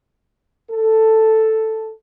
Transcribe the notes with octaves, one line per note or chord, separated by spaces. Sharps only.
A4